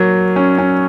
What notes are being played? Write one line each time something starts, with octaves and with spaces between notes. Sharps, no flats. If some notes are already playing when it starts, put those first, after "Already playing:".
Already playing: F#3 A#3
C#4
C#4